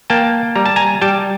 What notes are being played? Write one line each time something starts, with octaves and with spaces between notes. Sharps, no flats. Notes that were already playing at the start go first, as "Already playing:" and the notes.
A#3 G5 A5
G3 A#5
A5
G#5 A#5
G3 G5 A5